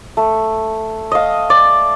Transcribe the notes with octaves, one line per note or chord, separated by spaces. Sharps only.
A3
D#5 F5
D5